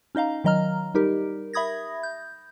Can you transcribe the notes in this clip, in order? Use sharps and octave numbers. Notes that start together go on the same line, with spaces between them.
C#4 D#4 D#5 F5 A#5
D#3 F#3 D#5 A#5 F6
G3 D#4 G4 A#4
E5 B5 D#6 G#6 A#6
G6